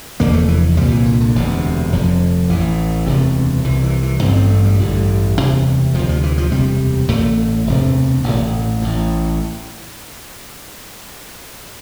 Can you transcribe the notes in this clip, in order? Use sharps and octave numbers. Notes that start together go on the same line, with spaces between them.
F1 E2 D3 A#3
A3
E3
C2 A#2 G3
E3
D3
D3
E1 D2 C3
F1 F2 D3
A1 A2 E3
E1 D2 C3
C2 C3 E3
E3
E3
A1 G2 D3 C4
C4
A3
G3
A1 G2 D3
E1 D2 C3
D2 C3 F3
F3
E3
F3
E1 D2 C3 G3
A1 A2 A3
E1 D2 C3
A1 A2
A1 A2